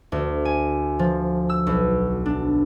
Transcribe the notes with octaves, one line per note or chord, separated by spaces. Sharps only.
D2
G#5
F3
E6
B1
D4